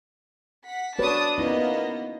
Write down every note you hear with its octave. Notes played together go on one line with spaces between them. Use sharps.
F#5 B6
D4 F#4 B4 C#5 A5 D#6
A#3 B3 C#4 D#4 E4 D#5